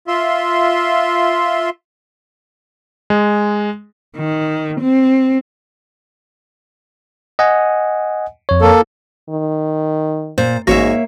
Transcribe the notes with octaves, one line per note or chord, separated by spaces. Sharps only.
F4 E5 C6
G#3
D#3
C4
D#5 F#5 G#5
F2 C#5
A#3 A4
D#3
A#2 C5
A1 G#2 A#3 F#4 C#5 E5 A#6